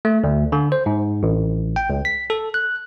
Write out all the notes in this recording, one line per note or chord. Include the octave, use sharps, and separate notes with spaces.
A3
D2
D3
C5
G#2
A1
G5
C#2
B6
A4
F#6